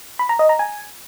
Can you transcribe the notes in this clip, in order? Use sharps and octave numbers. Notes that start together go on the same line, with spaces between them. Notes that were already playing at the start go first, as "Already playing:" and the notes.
B5
A#5
D#5
A#5
G#5